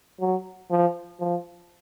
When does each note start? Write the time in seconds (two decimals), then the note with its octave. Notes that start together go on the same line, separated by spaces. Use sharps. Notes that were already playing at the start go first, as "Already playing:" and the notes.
0.20 F#3
0.71 F3
1.21 F3